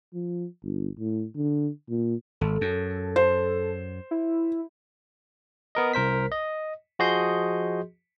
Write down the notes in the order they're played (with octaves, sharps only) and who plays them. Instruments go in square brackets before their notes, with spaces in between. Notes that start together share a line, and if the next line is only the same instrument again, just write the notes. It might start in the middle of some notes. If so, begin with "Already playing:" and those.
[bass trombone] F3
G1
A2
D3
A#2
[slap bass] G#1 [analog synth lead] A4
[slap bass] F#2
[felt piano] C5
[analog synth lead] E4
[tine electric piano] B3 A#4 D#5
C2 A#4 C5 B6
D#5
F3 F#4 G#4 D#5 C6 G6